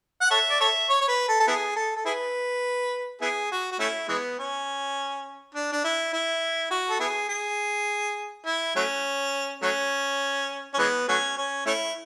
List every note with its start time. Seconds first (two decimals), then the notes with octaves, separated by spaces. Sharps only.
0.21 F#5
0.31 A4 C#5 E5
0.50 D5
0.61 A4 C#5 E5
0.89 C#5
1.01 C#5
1.08 B4
1.29 A4
1.40 A4
1.48 B3 E4 G#4
1.76 A4
1.97 A4
2.06 E4 G#4 B4
3.21 B3 E4 G#4
3.52 F#4
3.72 F#4
3.80 A3 C#4 E4
4.09 E3 G#3 B3
4.39 C#4
5.55 D4
5.73 D4
5.84 E4
6.13 E4
6.71 F#4
6.90 A4
7.00 B3 E4 G#4
7.29 G#4
8.46 E4
8.76 F#3 A3 C#4
9.62 F#3 A3 C#4
10.74 C#4
10.79 E3 G#3 B3
11.08 F#3 A3 C#4
11.38 C#4
11.66 A3 C#4 E4